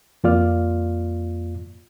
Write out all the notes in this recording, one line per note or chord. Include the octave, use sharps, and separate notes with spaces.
F2 A#3 F4 D5 F6